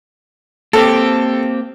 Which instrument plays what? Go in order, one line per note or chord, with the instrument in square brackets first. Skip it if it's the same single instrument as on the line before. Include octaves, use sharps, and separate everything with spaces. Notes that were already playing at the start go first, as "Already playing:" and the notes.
[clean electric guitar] A#3 C4 G4 [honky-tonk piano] A4